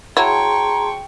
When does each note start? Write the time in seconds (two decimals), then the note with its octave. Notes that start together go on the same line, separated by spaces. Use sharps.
0.17 F#3 E4 G#4 G5 A5 A#5 C6 C#6